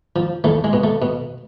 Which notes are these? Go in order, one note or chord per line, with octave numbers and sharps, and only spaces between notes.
F3
E2 A3
G#3
B2
A3
B2